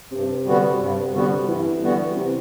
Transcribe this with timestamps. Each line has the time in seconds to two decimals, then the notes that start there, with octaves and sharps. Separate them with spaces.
0.12 G2 C3
0.46 D3 G3 B3 F#4
0.80 G2
1.13 D3 G3 B3 F#4
1.47 G2 E3
1.82 D3 G3 B3 F#4
2.16 C3